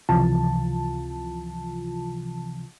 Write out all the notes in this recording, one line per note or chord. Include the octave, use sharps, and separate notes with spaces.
C#2 C3 E3 F3 F4 A5